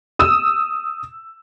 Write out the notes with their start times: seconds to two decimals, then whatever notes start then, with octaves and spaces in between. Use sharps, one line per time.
0.19 D#6 E6